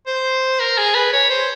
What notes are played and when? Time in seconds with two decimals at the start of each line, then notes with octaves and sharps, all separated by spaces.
0.07 C5
0.60 A#4
0.78 G#4
0.95 B4
1.13 C#5
1.30 C5